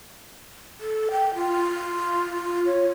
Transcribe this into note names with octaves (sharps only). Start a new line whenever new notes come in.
A4
G5
F4
C#5